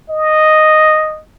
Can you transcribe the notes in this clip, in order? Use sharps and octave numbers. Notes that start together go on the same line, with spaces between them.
D#5